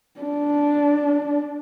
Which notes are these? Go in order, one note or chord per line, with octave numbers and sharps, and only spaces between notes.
D4